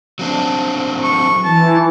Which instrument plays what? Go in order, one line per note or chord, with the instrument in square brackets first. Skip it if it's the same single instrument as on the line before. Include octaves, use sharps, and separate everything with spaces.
[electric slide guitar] F#3 C4 D4
[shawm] C#6
[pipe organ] E3 [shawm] A5